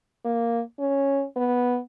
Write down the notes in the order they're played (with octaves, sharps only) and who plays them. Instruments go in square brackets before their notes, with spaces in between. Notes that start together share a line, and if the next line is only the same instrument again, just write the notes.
[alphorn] A#3
C#4
B3